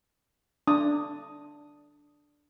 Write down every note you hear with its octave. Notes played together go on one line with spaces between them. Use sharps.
D4 D#6